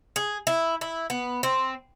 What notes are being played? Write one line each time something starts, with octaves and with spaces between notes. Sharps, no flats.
G#4
E4
E4
B3
C4